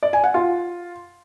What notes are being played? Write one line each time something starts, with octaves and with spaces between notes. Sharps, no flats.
D5
G#5
F#5
F4